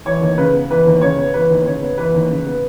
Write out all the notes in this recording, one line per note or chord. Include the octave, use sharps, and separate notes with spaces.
E3 C#5
D#2
C#3 B4
B3
E3 B4
D#2
C#3 C#5
B3
E3 B4
D#2
C#3 C#5
B3
E3 B4
D#2
C#3
B3